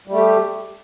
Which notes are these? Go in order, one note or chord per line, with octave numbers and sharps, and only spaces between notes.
G3 A3 G4